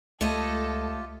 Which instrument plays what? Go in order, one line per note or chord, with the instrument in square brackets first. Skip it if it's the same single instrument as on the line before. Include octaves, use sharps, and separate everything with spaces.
[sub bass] C#2 [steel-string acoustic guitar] A3 C#5 D#5 [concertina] F4 G4 [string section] A4